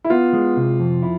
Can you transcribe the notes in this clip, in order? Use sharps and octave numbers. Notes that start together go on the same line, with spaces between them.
E4
B3 F4
G#3
C3
F2
E4